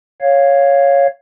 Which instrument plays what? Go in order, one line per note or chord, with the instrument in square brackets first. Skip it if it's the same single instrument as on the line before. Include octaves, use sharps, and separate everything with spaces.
[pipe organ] C#5 F5